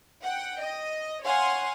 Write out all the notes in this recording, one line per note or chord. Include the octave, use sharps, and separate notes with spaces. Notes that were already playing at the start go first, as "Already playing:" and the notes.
F#5 G5
D#5
C#5 F5 F#5 G#5 C6